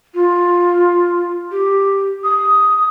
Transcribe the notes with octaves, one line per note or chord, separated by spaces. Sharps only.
F4
G4
D#6